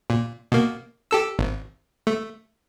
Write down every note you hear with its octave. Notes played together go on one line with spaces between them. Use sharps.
A#2
B2 A#3
G4 A4 E6
G#1
A3